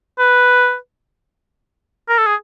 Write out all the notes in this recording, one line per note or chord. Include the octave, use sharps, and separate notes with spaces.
B4
A#4
A4
G#4